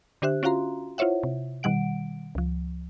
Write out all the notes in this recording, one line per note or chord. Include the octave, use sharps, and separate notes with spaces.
D3 D4 G4 C5 E5 F#6
C#4 F4 F#4 F5 A#5 C6
E4 F4 C5 C#5 E5 F#5
C3
B2 D#3 G3 F#5 D7
C#2 F3